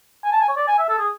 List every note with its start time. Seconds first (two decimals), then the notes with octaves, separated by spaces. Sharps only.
0.24 G#5
0.32 A5
0.41 G#5
0.49 C#5
0.57 D5
0.68 G#5
0.79 E5
0.89 A4
0.99 G#4